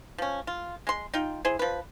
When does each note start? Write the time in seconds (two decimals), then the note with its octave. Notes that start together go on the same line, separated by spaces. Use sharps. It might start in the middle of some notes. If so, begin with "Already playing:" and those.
0.18 F3 C#4
0.47 F4
0.87 G#3 C6
1.14 D#4 F4 G5
1.45 E4 G#4 C5
1.59 F3 B4